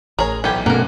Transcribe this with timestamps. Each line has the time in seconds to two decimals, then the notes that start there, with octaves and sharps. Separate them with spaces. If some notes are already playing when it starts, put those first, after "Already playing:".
0.19 A1 G#4 A#4 C#5 A#5
0.44 B1 E3 B3 G4
0.66 G2 B2 A3 A#3 C4 C#4 A#4 F#5